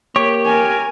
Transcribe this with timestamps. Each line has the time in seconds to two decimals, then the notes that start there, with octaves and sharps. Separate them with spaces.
0.16 A#3 G4 C#5
0.46 A#4 G#5